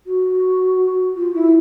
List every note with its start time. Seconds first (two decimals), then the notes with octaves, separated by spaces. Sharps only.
0.07 F#4
1.16 F4
1.34 E4